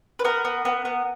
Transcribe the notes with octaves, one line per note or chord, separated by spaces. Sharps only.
B4
B3 A#4
B3
B3
B3